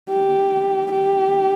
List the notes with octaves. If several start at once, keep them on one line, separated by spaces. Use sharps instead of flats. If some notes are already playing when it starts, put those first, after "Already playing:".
G4
G4